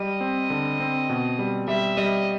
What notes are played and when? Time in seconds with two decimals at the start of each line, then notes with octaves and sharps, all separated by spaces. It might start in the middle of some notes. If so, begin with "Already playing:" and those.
Already playing: G3 D#5
0.21 C4
0.50 D3
0.80 C4
1.10 B2
1.39 G3
1.68 G3 E5
1.97 G3 D#5